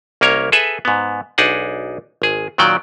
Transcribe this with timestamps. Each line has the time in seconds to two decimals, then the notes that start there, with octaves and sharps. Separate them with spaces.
0.21 C2 A#3 C#4 A#4 C#5
0.52 G#4 A4 B4 E5
0.85 G#2 B3
1.38 B1 D4 D#4 G#4 F#5
2.22 G#1 G#4
2.58 A#2 D#3 F#3 D5 G5